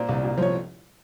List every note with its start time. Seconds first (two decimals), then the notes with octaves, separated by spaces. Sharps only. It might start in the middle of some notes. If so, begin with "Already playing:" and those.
Already playing: A#2 C5
0.09 C2
0.23 A#2
0.38 F3 C#5